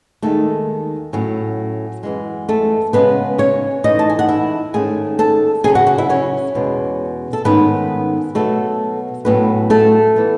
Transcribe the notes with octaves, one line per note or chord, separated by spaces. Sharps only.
D#2 D#3 G#3 A3 A4
A2 F#3 C#4
F#2 E3 G#3
A3 A4
C#3 G#3 B3 C#4 B4
C#4 C#5
G#2 E3 A3 D#4 D#5
A5
G#5
F#5
E4 E5
G#2 D#3 A3 C#4 G#4 G#5
A4 A5
C#3 F#3 C#4 G#4 G#5
F#4 F#5
F#4 F#5
E4 E5
C#4 C#5
E2 B2 G#3
A4
G#2 D#3 A3 B3 C#4 B4
B2 F#3 A3 B3 A4
A2 F#3 A3 B3 C#4 B4
A3 A4
E3 B3